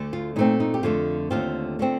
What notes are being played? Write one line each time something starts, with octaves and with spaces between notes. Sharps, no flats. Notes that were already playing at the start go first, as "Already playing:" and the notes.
Already playing: D2 D3 A3
F4
A#2 A3 C4 D#4
D#4
G4
F2 D3 A3 F4
D#2 D3 A3 C4 F4
D3 A3 C4